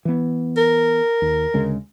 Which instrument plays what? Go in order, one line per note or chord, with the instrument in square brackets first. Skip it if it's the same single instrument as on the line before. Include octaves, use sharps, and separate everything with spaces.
[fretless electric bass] E3 B3
[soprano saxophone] A#4
[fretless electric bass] D#2
D2 C#3 G#3